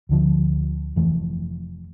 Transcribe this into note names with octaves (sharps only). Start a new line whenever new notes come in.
D2 D3 F3
F1 F2 E3 A3